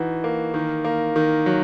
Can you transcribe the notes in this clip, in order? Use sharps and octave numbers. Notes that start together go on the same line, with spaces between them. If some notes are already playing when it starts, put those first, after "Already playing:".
Already playing: E3 D#4 F#4
A#3
D#3
A#3
D#3
F#3